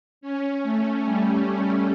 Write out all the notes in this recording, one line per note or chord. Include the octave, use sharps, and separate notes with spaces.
C#4
A3
G3
G3